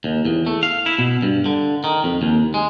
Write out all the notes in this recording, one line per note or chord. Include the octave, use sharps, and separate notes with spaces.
D#2
E2
A3
F5
E4
B2
G2
D3
D#3
F2
D#2
G#3